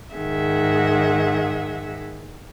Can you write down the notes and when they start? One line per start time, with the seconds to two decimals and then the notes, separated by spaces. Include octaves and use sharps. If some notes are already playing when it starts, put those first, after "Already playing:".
0.13 G#2 D#3 G#4 E5 F#5